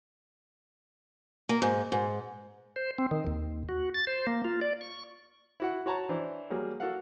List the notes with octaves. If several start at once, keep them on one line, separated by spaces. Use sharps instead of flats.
A#3
G#2
G#2
C5
C4
D#3
D#2
F#4
A6
C5
A#3
F4
D5
C#6
E4 F#4 F#5
F#4 C#5 A5 A#5
E3 D4 C5
F#3 G3 A#3 G#4
F#4 A4 A#4 F5 F#5